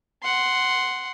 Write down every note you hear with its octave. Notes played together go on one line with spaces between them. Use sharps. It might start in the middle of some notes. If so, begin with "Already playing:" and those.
F#5 C6